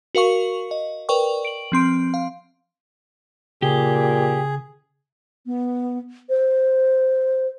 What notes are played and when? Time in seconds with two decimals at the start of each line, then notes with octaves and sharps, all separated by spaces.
0.15 F#4 A#4 F5 C#6
0.71 D#5
1.09 A#4 B4 D5 G5 C#6
1.45 D7 F#7
1.72 F3 C4 C6 D7
2.14 F5
3.62 A#2 C#3 G4 G#4
5.46 B3
6.29 C5